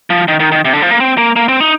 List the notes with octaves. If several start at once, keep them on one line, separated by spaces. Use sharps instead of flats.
F3
D#3
D#3
D#3
C3
D3
F3
A#3
C4
A#3
A#3
C4
D#4